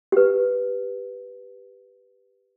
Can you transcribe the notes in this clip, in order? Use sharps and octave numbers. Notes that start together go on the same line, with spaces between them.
G4 B4